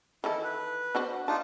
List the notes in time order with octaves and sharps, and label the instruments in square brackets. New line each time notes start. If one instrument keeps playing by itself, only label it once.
[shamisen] D#3 E3 A4 [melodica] E4
[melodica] B4
[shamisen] D4 F#4 C5
[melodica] D4 D#4 F4 [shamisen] A5